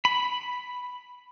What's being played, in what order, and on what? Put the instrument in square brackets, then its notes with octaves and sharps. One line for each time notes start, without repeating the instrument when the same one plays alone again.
[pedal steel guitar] B5